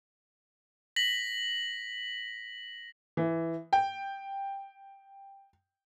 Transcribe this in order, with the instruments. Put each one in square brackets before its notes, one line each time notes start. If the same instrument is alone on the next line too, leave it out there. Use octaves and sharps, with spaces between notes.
[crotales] A#6 B6 F#7
[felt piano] E3
G5